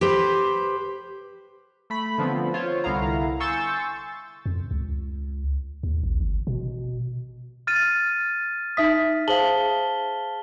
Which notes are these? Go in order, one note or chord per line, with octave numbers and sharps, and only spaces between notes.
G4 B4 C5
A3 B5
D3 F3 B3 C4
F4 C5 C#5
C2 D3 B3 E4 F5 A#5
G#5 C6 C#6 E6 G6 A6
F2
C#2
D#2
A1
G1
B2
F6 A6 D#7
D#4 E5 D#6 B6
G#4 C5 F5 A5 F#7 G7